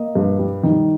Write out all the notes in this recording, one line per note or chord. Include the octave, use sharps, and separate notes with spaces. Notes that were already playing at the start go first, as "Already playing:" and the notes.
Already playing: A#3 D#5
G2
G3
D#3